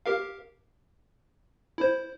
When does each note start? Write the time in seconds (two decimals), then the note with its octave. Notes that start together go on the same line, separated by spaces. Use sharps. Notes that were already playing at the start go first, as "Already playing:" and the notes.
0.06 G4 A#4 F5
1.78 E4 C5